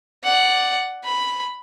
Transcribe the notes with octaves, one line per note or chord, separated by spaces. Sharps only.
D5 F#5
B5